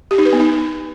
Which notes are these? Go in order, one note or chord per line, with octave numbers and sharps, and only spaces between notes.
G4
D#4
B4
B3
D#4